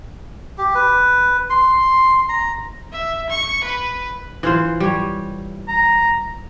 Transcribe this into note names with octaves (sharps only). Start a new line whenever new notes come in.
G4
B4
C6
A#5
E5
C#6
B4
E3 F4 C5
G3 C#5
A#5